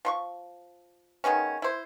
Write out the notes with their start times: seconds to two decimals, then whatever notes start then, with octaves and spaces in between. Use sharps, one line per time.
0.05 F3 C6 C#6
1.24 D#3 G#3 B3 C#4
1.62 E4 C5